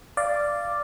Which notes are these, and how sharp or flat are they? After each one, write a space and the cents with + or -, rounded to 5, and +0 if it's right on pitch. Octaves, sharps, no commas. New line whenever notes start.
D5 +0 F5 -15